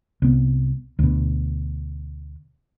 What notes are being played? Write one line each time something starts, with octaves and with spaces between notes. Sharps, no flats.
C2 B3
D2 B2